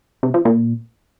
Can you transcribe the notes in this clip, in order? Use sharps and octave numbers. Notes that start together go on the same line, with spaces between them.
C3
F3
A#2